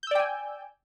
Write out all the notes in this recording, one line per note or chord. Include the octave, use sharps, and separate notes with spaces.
D5 G5 G#5 E6 G6